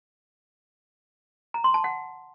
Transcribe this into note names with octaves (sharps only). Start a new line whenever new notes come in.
A#5
C6
A5
F#5